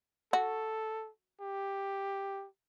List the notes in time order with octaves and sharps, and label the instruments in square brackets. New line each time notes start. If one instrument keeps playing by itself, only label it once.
[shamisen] F#4 [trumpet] A4
[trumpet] G4